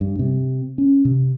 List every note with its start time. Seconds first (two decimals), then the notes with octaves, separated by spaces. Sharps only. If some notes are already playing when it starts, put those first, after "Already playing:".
0.01 G2
0.19 C3
0.78 C#4
1.05 C3